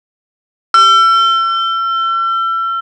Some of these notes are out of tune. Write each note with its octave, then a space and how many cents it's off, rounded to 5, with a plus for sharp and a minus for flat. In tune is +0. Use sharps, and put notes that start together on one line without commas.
E6 +40